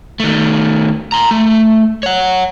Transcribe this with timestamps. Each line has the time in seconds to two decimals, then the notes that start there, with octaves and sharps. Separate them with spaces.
0.20 D#3 A3
1.12 A#5 C6
1.31 A3
2.03 C#5 F#5